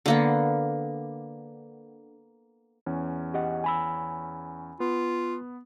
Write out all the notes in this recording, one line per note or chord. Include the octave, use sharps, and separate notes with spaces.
D3 A#3 B3
E2 C#4
G4 D#5 F#5
G#5 B5 E6
B3 F4